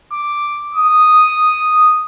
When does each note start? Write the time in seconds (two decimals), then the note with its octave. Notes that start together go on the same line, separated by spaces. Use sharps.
0.13 D6
0.75 D#6